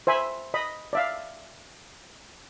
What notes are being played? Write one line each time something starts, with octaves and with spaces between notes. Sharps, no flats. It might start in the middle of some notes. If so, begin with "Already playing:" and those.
C5 E5 G#5 B5
D#5 B5
D5 E5 F5